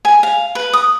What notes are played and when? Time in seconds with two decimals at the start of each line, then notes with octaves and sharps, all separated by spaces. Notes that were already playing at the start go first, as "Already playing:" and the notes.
0.05 G#5
0.23 F5
0.55 B4
0.73 D#6